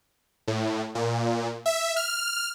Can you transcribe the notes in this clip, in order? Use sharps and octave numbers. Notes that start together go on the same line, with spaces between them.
A2
A#2
E5
F6